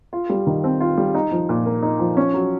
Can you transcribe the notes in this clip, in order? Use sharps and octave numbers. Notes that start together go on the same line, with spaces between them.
F4
G3
D#3
C4
F4
G3
D#4
F3
A#2
A#3
D#4
F3
C#4
F#3